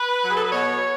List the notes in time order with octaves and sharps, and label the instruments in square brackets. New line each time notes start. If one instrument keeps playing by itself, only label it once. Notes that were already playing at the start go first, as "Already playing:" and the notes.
Already playing: [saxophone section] B4
F#3 F#4
G#4
A4
B4
B2 C#5